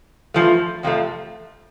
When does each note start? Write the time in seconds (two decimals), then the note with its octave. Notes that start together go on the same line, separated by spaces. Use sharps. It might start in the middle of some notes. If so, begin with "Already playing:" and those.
0.34 G2 F3 A3
0.83 F2 C3 F3 A3